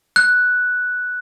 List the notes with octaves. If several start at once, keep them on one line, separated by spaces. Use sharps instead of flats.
F#6